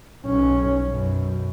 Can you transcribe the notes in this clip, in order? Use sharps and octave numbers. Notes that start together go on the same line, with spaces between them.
B1 C#4
F#2 B2